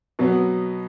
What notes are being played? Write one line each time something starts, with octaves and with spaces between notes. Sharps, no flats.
B2 F#3 B3